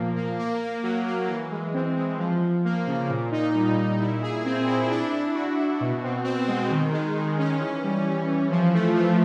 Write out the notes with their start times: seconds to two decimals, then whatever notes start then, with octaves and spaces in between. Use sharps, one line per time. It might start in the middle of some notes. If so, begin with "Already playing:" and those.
Already playing: A#2 F3 A#3
0.16 A#3
0.39 A#3
0.61 A#3
0.83 F#3
1.06 A#3
1.29 E3
1.52 G#3
1.74 C4
1.97 G#3
2.19 F3
2.42 F3
2.65 A#3
2.87 C#3
3.10 A#2
3.31 D#4
3.55 G3
3.77 A#2
3.99 E4
4.22 G#4
4.45 C4
4.67 E4
4.90 D4
5.12 D4
5.34 F#4
5.57 F#4
5.81 B2
6.03 C4
6.24 C4
6.48 G#3
6.71 D#3
6.92 G#3
7.15 D#3
7.38 C#4
7.61 E3
7.83 G3
8.05 E3
8.28 E3
8.50 F3
8.74 A3
8.96 F3